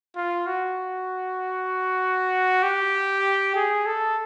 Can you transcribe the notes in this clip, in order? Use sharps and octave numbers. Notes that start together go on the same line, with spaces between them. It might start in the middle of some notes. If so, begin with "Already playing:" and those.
F4
F#4
G4
G#4
A4